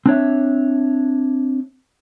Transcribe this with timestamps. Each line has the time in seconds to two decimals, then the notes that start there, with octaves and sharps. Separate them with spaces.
0.06 C4 D4 C#5 E5